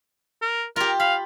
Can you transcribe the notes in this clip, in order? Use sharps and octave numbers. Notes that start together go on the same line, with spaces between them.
A#4
F4 G4 A#4
F5 B5